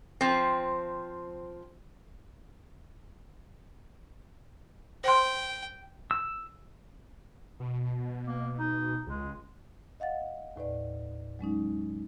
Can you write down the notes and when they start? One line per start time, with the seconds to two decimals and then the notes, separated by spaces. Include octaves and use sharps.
0.21 F3 C4
5.04 C5 G5 C6
6.11 E6
7.60 B2
8.27 A#3
8.59 D#4
9.07 C#2 G#3
10.00 D#5 F5 F#5 A6
10.56 D#2 A2 B4 D5
11.39 F#3 G#3 C#4 D#4